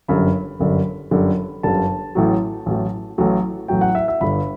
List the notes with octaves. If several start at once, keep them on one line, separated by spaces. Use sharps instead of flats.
G1 F#2 D3 G3 B5
G1 F#2 D3 G3
G1 F#2 D3 G3
G1 F#2 D3 G3 A5
A1 A2 F#3
A1 A2 F#3
A1 A2 F#3
A1 A2 F#3 G5
F#5
E5
E5
G1 G2 D3 B5